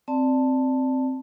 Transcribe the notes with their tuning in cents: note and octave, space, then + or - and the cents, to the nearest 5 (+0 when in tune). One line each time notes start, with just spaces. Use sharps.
C4 +0 D5 +5 A5 +5